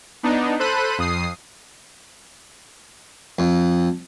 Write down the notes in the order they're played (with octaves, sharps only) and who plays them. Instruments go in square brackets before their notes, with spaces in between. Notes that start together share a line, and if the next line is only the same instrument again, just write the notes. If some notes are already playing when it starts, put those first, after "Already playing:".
[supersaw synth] B3 D4 D#4
A4 C5 B5 F#6 D#7
F2 D#6 C7
[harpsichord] F2